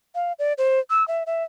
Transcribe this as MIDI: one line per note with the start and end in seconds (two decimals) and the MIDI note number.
0.15 0.33 77
0.39 0.53 74
0.58 0.79 72
0.90 1.06 88
1.08 1.23 76
1.27 1.43 76